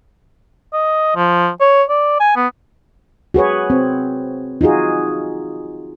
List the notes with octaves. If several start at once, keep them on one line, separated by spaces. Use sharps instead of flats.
D#5
F3
C#5
D5
G#5
B3
F#4 G#4 B4 C#5
C4
D#4 F4 F#4 G#4